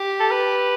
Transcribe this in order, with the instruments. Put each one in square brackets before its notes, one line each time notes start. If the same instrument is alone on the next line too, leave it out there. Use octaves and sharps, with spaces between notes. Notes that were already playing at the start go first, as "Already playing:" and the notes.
Already playing: [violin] G4
[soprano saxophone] A4
B4